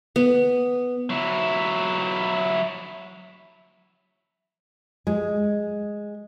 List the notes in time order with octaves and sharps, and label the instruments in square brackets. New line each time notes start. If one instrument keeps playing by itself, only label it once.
[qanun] B3
[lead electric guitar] F#3 E4
[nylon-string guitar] G#3